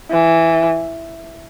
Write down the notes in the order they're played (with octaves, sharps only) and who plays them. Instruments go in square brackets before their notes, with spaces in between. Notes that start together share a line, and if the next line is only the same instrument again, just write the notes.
[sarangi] E3